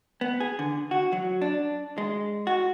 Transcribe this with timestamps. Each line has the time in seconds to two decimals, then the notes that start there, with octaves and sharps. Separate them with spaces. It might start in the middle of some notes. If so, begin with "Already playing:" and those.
0.21 B3
0.40 G#4
0.59 D3
0.91 F#4
1.12 F#3
1.42 D4
1.98 G#3
2.47 F#4